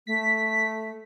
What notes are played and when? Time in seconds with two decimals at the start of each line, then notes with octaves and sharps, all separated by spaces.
0.07 A3 B6